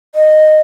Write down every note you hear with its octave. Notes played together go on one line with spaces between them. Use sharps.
D#5